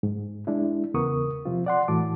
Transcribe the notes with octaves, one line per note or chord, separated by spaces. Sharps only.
G#2
G#3 D4 E4
E2 C#3 B3 A#4 C#6 D#6
C3 F3 C4 F4
D5 F#5 C6
A2 E3 F#4 A5 D6